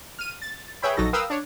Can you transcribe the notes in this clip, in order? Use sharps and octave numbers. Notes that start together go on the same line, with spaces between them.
F6 D#7
A6
G#4 B4 C#5 E5 G5 B5
A#1 F#3 D#4 F#4 A4 A#6
A#4 B4 F5 G5 D#6 E6
D4 C#5